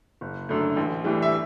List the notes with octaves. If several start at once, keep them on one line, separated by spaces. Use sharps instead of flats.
F#1
F#2 D3 A3
A1
A2 E3 G3
E5